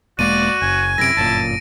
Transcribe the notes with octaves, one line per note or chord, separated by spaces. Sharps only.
E1 G#3 A#3 F#4 D5 D#7
F#1 G#5
F#2 A2 C3 E4 A#6 D7
G1 F#2 A#2 A5